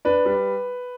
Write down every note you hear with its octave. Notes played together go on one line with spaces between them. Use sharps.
D4 B4
G3